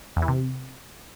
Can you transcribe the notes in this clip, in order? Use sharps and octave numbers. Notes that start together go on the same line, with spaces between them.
E2
E3
C3